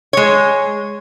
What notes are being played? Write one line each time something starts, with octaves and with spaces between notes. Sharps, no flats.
G#3 C#5